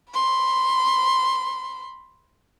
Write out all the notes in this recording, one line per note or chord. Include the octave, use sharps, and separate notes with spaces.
B5 C6